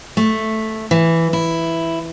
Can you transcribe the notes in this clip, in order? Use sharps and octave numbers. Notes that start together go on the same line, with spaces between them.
A3
E3
E4